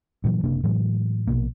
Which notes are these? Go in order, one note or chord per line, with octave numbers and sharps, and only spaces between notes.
G2 A#2 E3 F#3
F#1 C3 A#3 D4
A2 E3 F#3 G#3
A#1 F#2 B2 A#3